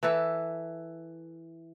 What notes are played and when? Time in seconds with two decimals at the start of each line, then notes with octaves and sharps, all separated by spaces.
0.03 E3 A4 B4